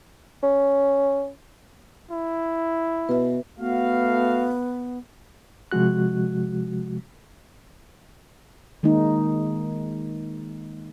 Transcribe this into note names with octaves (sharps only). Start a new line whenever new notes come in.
C#4
E4
B2 B4 E5
A3 B3 F#4 F5
C3 F3 G#3 F#4 F#6
D#3 G#3 A#3 D#4